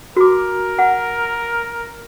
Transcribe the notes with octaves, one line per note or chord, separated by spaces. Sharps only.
F#4 A#4 D6
F#5